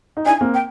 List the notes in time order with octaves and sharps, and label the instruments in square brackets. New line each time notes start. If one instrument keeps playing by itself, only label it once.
[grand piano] D#4
[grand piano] D4 E4 [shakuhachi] G#5
[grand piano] A#3 C4
[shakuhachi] G5